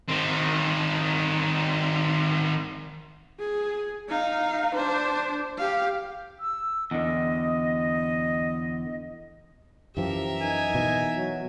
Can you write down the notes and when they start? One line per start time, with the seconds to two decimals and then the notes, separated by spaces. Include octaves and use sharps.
0.08 D#3 C4
3.40 G#4
4.09 D#4 F5
4.75 D4 C5
5.58 G4 F5
6.40 E6
6.91 E2 D3 D#5
9.97 F#2 E3 F3 G4 A#4 E5
10.42 D#4 G#5
10.75 B2 E3
11.16 F#3